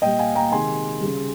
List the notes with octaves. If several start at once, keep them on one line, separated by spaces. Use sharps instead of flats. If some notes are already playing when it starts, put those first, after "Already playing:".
A#2 G3 D#5 G5
F5 G#5
G5 A#5
C3 D#3 G#3 G#5 C6
C#3 G3